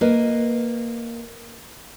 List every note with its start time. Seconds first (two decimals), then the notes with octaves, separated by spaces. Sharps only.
0.01 A#3 B4 D#5